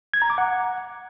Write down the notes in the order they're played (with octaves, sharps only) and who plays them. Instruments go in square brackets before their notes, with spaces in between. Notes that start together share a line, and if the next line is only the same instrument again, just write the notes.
[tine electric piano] G#6
A#5
D6
F#5